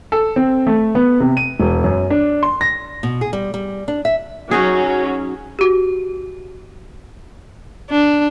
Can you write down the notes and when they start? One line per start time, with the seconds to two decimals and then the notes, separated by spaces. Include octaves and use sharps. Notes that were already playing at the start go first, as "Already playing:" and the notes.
0.12 A4
0.36 C4
0.67 A3
0.95 B3
1.20 C3
1.37 D#7
1.60 E1
1.84 F#2
2.10 D4
2.43 C6
2.61 A#6
3.03 B2
3.21 G#4
3.33 G3
3.54 G3
3.88 D4
4.05 E5
4.51 F#3 C#4 D#4 F#4 G#4
5.59 F#4 G4
7.90 D4